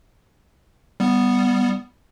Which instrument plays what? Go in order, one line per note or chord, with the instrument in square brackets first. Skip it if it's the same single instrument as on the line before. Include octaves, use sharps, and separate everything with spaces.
[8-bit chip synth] G3 B3